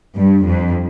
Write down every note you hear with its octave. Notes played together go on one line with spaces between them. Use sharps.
G2
F2